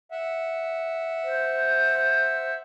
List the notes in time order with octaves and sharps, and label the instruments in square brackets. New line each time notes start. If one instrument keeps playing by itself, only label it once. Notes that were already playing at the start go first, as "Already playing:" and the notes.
[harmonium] E5 F#5
[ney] C5